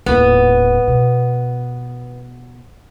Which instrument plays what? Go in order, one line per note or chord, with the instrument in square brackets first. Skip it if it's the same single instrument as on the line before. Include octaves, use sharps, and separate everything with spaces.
[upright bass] D#1 A1 [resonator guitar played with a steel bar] B3
[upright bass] B2